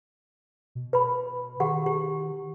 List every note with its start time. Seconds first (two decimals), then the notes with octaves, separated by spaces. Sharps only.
0.75 B2
0.93 B4 B5
1.60 D#3 F#4 G4 F#5
1.86 G4